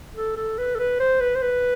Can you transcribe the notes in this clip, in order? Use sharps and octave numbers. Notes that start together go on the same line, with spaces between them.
A4
A4
B4
A4
B4
C5
B4
C5
B4